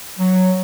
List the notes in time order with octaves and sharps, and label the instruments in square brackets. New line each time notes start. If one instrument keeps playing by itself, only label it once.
[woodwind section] F#3